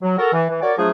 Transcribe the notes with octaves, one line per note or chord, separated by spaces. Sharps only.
F#3
F#4 A4 A#4
E3
E3
F#4 A#4 C#5 D5
F3 F#3 A3 D4 G#4